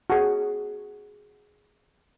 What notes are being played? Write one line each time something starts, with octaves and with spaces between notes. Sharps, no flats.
F#4 G#4